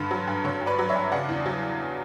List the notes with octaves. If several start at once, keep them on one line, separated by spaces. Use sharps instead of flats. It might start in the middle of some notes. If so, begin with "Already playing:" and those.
Already playing: G2 D3 B4
F#3
G2
D3 C#5
G2
B4 D5
F#3
C#5 E5
G2
C#3 D5 F#5
E2
F#3